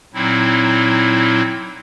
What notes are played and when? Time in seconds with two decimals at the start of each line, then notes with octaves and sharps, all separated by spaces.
0.14 A#2 F#3 C4 D#4 E4